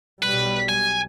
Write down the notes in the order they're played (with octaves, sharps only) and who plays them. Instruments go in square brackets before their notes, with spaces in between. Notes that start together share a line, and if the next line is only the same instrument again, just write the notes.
[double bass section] B1 G3 [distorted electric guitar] B4
[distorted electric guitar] G#5